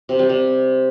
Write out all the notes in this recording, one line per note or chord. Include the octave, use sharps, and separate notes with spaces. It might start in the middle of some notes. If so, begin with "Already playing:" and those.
C3
G3
C3